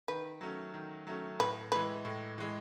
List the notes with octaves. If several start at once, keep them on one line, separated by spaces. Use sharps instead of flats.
D#3 B4
F#3 A3 C#4
D#3
F#3 A3 C#4
A2 B4
E3 G#3 B4
A2
E3 G#3